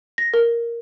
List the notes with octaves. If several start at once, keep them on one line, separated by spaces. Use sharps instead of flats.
A#6
A#4